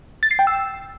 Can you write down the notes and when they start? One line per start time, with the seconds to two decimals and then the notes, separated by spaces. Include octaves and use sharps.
0.23 A6
0.31 C7
0.39 G5
0.47 E6